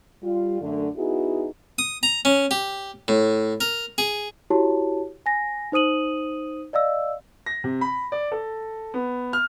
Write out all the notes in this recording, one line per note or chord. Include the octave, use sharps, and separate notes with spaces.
G3 F4
F#2 D3 A3
B3 D#4 E4 F#4 G#4
D#6
A#5
C#4
G4
A2
A#4
G#4
E4 F#4 G4 C#5 A5
G#5 A#6
D#4 C5 D#6 D#7 F#7
D5 D#5 F5 E6
A#6
C3
B5
D5
A4
B3
F6